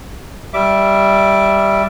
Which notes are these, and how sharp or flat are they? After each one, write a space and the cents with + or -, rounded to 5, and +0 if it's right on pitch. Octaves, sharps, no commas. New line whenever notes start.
G3 +0 E5 +0 D6 +0